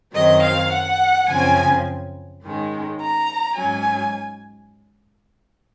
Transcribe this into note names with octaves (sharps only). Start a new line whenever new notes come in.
F#2 D#3 F#3 C4 D#5
F5
F#5
F#2 C#3 F3 C4 G#5
G#2 D#3 G#3 C#4
A#5
G#2 F#3 C#4 G#5